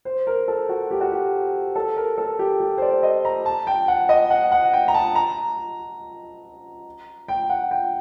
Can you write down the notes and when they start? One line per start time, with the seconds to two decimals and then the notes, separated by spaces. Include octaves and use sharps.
0.05 C5
0.27 A#4
0.48 A4
0.69 F#4
0.91 G4
1.01 F#4
1.12 G4
1.75 A4
1.97 A#4
2.18 A4
2.39 G4
2.60 G4
2.78 C5
2.82 D5
3.03 D#5
3.25 A#5
3.46 A5
3.67 G5
3.88 F#5
4.09 D#5
4.30 F#5
4.52 F#5
4.73 G5
4.88 A#5
4.94 A5
5.15 A#5
7.28 G5
7.50 F#5
7.71 G5